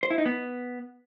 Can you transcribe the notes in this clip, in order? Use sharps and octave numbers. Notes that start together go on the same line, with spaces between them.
C5
E4
D#4
B3